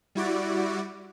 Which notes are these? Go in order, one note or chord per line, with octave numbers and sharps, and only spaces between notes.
G3 E4 F#4 D5